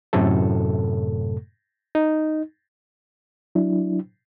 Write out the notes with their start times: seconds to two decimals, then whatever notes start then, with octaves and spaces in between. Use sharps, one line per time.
0.13 F#2 A2 C3 A3 A4
1.95 D#4
3.55 F#3 D4 E4